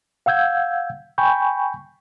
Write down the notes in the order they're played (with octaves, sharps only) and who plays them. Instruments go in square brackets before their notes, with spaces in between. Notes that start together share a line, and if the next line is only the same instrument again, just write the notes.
[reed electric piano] F5 F#5 E6 G6 G#6
G5 G#5 B5 C#6 G6